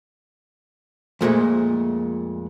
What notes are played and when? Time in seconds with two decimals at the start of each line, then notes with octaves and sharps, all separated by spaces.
1.21 F2 A#2 G#3 A3